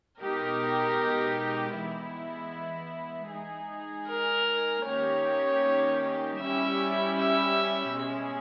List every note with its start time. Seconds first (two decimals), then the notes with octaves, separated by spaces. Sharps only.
0.21 B2 G#3 D#4 G4 A#4
1.76 E3 G#3 B3 E4
3.31 G#3 D#4 G#4
4.09 A#4
4.86 D#3 A#3 C#4 G4 C#5
6.40 G3 C#4 E4 G4 E5
7.18 E5
7.95 B2 G#3 C#4 G#4